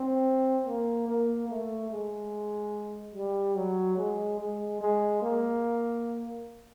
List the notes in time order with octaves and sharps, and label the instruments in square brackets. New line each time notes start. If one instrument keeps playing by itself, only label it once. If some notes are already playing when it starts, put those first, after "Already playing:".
Already playing: [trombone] C4
A#3
A#3
A3
G#3
G3
F#3
G#3
G#3
G#3
A#3